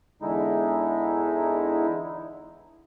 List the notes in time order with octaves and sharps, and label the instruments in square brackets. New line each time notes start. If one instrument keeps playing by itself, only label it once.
[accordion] E2 D3 G#3 D#4 E4